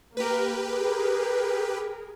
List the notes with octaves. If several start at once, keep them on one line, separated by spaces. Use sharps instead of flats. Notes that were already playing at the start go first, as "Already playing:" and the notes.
A#3 G4 A#4 B4
G#4 A#4